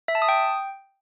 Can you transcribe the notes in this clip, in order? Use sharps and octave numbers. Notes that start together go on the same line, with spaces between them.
E5
A5
D#6
G5